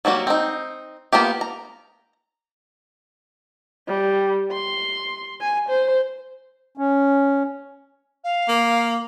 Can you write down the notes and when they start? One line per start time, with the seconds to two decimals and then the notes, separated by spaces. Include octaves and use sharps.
0.05 F#3 G3 A#3 F#4
0.27 C4 D#4
1.13 A#3 B3 F4 G4
1.41 A#5
3.88 G3
4.53 C6
5.41 G#5
5.69 C5
6.77 C#4
8.24 F5
8.48 A#3